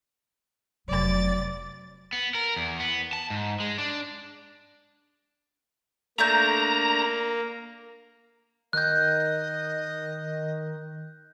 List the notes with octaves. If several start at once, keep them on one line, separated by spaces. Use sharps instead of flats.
F1 C3 F#3 D5 A6
B3
A#4
E2
B3
A5
G#2
G#3
D4
A3 A#3 D4 A#5 G6
D#3 D#5 F#6 G6